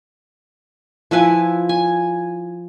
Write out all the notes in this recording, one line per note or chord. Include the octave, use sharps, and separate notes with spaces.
F3 E4 B4 G#5
G#5